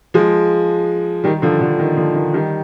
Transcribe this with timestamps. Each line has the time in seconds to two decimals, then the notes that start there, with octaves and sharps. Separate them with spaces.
0.14 F3 G#3
1.24 D#3 G3
1.42 D3 F3
1.61 D3 F3
1.79 D#3
1.97 D3 F3
2.15 D#3
2.34 D#3 G3